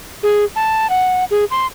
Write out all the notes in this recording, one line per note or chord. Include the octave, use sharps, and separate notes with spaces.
G#4
A5
F#5
G#4
C6